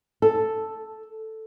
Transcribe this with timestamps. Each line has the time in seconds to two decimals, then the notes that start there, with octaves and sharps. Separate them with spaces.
0.22 A4